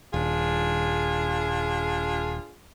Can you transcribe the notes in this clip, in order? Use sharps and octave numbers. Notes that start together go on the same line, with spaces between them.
D#1 D4 F4 G#4